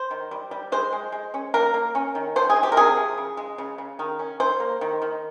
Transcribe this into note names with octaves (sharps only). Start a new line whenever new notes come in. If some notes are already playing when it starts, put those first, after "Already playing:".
Already playing: C5
D#3
G3
G3
G#3 C5
G#3
G#3
C#4
A#3 A#4
A#3
C#4
D#3
F3 C5
G#4
G#3
G4
A#4
C3 G#4
F3
C#3
G#3
C#3
C#3
D#3
C#4
C#4 C5
A#3
D#3
D#3